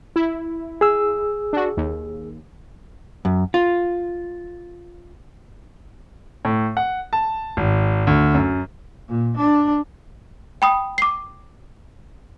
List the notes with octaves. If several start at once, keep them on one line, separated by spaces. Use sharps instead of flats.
E4
G#4 E6
D4 F#4
D#2
F#2
F4
A2
F#5
A5
G#1
D2
F#2
A#2
D4
G5 B5 D#6
D6 C7